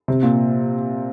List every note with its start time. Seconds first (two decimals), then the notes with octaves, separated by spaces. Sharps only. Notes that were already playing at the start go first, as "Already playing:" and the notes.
0.08 C3
0.23 A#2